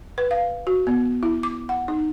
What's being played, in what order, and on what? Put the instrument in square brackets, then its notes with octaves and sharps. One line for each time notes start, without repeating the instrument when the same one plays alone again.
[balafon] B4
F5
F#4
B3
E4
D6
F#5
D#4